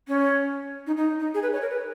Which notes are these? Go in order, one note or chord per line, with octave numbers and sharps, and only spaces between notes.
C#4
D#4
D#4
D#4
G#4
B4
C#5
A#4
B4